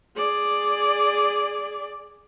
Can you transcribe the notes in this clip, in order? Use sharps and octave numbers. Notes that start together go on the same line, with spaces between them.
G#4 D5